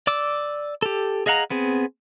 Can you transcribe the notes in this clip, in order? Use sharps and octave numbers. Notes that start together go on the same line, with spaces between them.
D5 D6 E6
G4 A4
G#4 D#5 F5 F#5 A#5
B3 C4 G#4